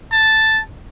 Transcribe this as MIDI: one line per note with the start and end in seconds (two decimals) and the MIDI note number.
0.12 0.60 81